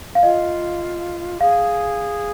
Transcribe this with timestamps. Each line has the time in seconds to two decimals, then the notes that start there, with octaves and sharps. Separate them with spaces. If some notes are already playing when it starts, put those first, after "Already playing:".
0.15 F5
0.23 F4 D#5
1.41 G#4 F5